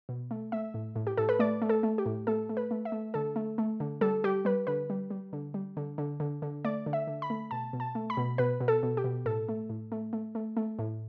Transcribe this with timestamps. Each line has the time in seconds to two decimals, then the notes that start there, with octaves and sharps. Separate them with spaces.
0.09 B2
0.31 A3
0.52 A3 E5
0.74 A2
0.96 A2
1.07 G4
1.17 A2 A4
1.29 B4
1.39 A3 D5
1.62 A3
1.69 A4
1.83 A3
1.98 G4
2.06 A2
2.27 A3 A4
2.49 A3
2.57 B4
2.71 A3
2.85 E5
2.92 A3
3.14 D3 A4
3.36 A3
3.58 A3
3.80 D3
4.01 G3 A4
4.24 G3 G4
4.45 G3 B4
4.67 D3 B4
4.90 G3
5.10 G3
5.33 D3
5.54 G3
5.77 D3
5.98 D3
6.20 D3
6.42 D3
6.65 A3 D5
6.86 D3
6.93 E5
7.07 D3
7.22 B5
7.30 A3
7.51 B2 A5
7.73 B2
7.80 A5
7.95 A3
8.10 B5
8.17 B2
8.38 B2 B4
8.61 B2
8.68 A4
8.83 B2
8.97 G4
9.04 B2
9.26 A2 A4
9.49 A3
9.70 A2
9.92 A3
10.13 A3
10.35 A3
10.57 A3
10.79 A2